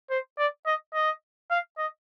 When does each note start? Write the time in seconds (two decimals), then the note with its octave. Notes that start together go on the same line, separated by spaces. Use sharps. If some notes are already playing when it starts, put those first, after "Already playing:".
0.10 C5
0.38 D5
0.66 D#5
0.94 D#5
1.50 F5
1.78 D#5